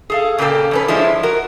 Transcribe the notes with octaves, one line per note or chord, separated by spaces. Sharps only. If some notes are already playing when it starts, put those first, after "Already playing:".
G#4 A4 F5
A#2 C#3 A#3 C#4 G4 A4
F2 C#4 B4
F3 G#3 D4 E4
F#4 A#4